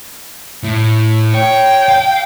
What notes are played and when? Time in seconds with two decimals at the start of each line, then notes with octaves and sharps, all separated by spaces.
0.63 A2
1.34 C#5 G5
1.89 F5